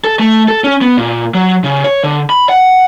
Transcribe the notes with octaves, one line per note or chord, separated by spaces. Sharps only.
A4
A3
A4
C#4
B3
A#2
F#3
C#3
C#5
D3
B5
F#5